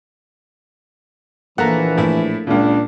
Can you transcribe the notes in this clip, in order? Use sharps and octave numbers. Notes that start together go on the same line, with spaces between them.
A#1 E3 A3 A#3 F#5 A#5
A2 E4
C#2 A#2 C#3 D4